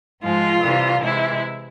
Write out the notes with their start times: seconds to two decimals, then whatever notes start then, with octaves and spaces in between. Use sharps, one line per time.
0.22 G#2 F3 G#3 F4
0.62 C3 E3 G3
1.02 C3 E3 G#3 E4